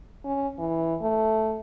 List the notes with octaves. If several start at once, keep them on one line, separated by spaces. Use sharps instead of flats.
C#4
E3
A3